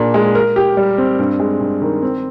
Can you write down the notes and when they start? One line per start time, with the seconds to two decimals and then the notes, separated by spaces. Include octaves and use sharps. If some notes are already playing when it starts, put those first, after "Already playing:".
Already playing: A#2 D4 G#4
0.14 G#3
0.35 A#4
0.56 G4
0.77 G3
0.98 C4
1.19 G2
1.40 G#3
1.60 G2
1.82 D#3
2.02 C4